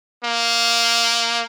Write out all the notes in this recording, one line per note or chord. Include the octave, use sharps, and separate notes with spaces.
A#3